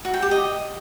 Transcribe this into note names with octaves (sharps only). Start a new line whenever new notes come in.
F#4
G5
G4
D#5